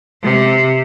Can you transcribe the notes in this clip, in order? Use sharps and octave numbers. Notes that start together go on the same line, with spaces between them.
C3